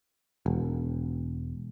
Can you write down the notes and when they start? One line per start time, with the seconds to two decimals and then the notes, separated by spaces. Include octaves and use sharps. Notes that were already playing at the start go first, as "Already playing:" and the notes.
0.46 E1